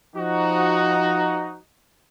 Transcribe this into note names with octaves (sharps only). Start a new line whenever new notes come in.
F3 D#4 F#4